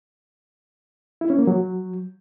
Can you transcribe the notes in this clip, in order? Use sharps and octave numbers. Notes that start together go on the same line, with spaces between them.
E4
C#4
A#3
F#3